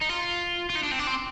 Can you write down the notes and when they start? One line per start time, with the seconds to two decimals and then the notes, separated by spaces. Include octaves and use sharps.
0.01 D#4
0.09 F4
0.70 F4
0.75 D#4
0.83 D4
0.91 C4
0.99 D4
1.07 C4